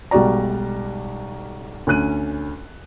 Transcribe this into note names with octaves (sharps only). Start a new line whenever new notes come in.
B1 G3 G#3 F#4 D5 A#5
D2 C#4 F#6 D#7